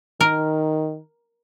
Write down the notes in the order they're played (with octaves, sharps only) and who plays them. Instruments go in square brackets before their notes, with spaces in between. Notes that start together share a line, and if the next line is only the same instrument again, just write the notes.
[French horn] D#3 [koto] A#4